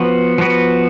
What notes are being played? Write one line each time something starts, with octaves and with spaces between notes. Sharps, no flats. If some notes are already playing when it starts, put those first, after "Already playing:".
Already playing: F3 B3 F#4 B4
F3 B3 F#4 B4